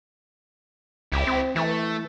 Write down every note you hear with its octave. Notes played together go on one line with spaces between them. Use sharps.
C#2 E4 G4
C4
E3 A3